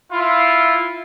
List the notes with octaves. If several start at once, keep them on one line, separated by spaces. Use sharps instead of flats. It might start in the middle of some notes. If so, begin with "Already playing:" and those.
E4 F4